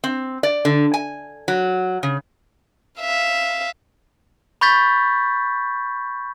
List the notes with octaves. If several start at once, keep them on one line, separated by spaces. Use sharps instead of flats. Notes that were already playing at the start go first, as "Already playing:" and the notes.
C4
D5
D3
G#5
F#3
C#3
E5 F5
B5 C#6 G6 A6 B6